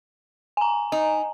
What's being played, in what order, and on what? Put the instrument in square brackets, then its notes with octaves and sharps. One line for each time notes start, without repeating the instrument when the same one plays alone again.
[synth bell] G#5 A#5
[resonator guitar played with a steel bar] D#4